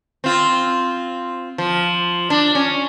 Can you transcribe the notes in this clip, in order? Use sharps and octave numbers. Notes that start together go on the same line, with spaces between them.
C4 F4
F3
D4
C#4